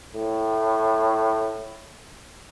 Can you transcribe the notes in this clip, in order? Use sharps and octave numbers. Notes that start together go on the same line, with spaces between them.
A2